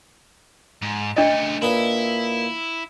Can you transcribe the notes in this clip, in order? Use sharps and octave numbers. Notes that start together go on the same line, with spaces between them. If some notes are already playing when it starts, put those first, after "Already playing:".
G#2
C#3 A3 D4 D#5
A#2 D#4 E4 B4